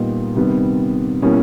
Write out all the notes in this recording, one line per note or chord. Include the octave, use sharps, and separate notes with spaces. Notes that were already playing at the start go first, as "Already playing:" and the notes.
Already playing: A#2 G3 B3 D#4
C3 D#3 G3 B3
B2 G3 A#3 C#4 E4